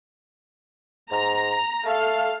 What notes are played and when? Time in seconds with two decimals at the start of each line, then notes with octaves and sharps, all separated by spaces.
1.11 G#2 A#5
1.86 A3 A4 F5